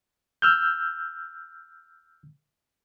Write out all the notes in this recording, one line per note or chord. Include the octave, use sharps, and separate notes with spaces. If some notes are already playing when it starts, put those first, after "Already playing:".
E6 F6 G6